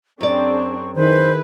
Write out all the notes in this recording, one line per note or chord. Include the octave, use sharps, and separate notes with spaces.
F#2 C4 D4 G#4 D5 C#6
D#3 E4 G#4 B4 C5